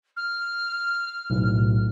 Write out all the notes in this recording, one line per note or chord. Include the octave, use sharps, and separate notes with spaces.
F6
B1 A2